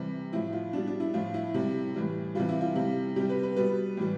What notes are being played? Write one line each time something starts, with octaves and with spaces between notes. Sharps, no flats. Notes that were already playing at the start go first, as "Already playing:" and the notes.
Already playing: C3 E3 G3
A2 F3 E4
F4
B2 G3 D4
D4
E4
A2 F3 F4
E4
C3 G3
A2 E3 G3
C3 E3 G3 F4
E4
F4
C3 G3
C3 G3 G4
B4
B4
B2 G3 B4
A2 E3 G3